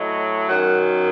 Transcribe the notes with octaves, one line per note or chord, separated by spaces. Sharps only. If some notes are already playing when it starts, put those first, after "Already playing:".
Already playing: A2 F#3 D#5
F#2 D#3 F#3 F#5